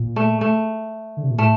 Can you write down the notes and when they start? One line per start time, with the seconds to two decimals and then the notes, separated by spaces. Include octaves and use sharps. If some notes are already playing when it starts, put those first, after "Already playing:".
Already playing: A#2
0.16 A3
0.41 A3
1.17 D3
1.23 C3
1.31 A#2
1.38 A2 A3